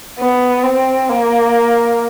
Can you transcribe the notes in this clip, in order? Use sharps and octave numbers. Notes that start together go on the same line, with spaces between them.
B3
C4
A#3